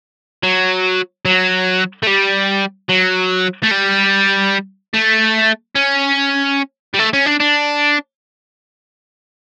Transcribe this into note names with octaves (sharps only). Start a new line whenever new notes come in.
F#3
F#3
A3
G3
F#3
A3
G3
A3
C#4
G3
A3
C#4
D4
D4